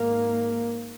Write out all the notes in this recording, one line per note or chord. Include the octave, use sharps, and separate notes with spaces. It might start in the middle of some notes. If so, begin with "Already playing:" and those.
Already playing: G#1 G#2 A#3